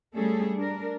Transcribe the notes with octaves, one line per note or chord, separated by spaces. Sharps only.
G3 A3 C#4 G#4 A4
D4 A#4